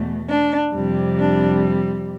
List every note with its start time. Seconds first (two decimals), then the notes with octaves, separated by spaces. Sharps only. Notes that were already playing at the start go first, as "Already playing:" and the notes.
Already playing: E2 B2 A3
0.29 D4
0.74 F2 C3 G3
1.19 D4